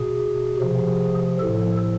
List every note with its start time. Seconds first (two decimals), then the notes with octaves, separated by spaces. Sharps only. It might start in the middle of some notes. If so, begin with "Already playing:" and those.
Already playing: B2 G#4
0.57 C3 F3
1.39 A2 F3 A4